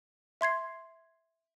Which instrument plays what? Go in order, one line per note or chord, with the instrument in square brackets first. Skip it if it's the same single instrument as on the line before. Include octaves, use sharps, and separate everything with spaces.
[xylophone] E5 C6 G#6 C7